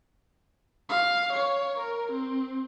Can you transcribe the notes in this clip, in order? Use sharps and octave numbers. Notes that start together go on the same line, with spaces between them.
F5
C#5
A#4
C4